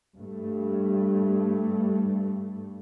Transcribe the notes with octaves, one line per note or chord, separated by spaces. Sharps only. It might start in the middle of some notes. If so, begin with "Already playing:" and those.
G2 A3